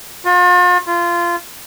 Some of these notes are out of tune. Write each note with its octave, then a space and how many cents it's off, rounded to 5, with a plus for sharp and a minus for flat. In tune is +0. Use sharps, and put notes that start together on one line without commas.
F4 +40
F4 -20